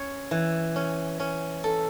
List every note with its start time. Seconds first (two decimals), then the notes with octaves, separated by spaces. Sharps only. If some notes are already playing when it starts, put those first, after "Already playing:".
Already playing: C#4 C#5
0.31 E3
0.76 C#4
1.20 C#4
1.64 A4